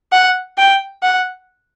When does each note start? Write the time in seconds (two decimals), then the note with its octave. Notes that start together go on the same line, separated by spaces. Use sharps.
0.12 F#5
0.58 G5
1.03 F#5